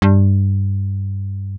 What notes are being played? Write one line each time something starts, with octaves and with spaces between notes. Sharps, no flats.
G2